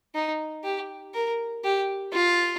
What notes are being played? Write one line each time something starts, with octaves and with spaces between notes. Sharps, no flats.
D#4
G4
A#4
G4
F4